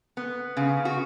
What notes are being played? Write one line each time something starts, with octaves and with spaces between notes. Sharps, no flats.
B3
C#3
F#4